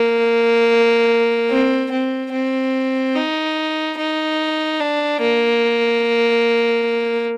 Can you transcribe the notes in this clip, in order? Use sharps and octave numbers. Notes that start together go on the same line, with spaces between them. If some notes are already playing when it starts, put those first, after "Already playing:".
Already playing: A#3
C4
C4
C4
D#4
D#4
D4
A#3